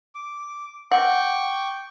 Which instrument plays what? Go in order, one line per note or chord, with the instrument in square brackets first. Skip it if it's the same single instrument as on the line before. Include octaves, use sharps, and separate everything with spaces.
[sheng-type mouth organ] D6
[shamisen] F#5 [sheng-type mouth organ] G5 C#6 D6